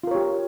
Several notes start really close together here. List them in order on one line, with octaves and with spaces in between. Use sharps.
F4 A#4 C#5 G4